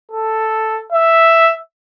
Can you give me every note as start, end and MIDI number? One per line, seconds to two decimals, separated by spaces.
0.11 0.81 69
0.92 1.56 76